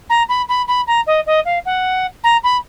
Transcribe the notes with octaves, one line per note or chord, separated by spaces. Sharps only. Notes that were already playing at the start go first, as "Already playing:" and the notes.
A#5
B5
B5
B5
A#5
D#5
D#5
F5
F#5
A#5
B5